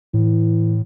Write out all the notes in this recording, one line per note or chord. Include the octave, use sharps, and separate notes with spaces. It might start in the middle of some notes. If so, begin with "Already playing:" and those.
A2 E3